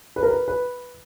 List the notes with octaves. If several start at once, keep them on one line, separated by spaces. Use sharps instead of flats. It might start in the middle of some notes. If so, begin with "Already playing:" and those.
B4
A#4
B4
B4